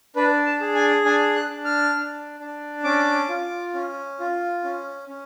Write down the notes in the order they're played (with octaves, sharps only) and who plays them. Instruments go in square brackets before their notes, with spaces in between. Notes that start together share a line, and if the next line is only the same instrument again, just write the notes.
[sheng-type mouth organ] D4 B4
A5
G#4
G#5
D4 G#5
F#6
D4
F6
D4
D4
C#4 D6
F4
C#4
F4
C#4
C#4